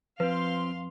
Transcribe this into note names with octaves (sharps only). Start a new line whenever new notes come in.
F2 F3 C4 B4 F5 C6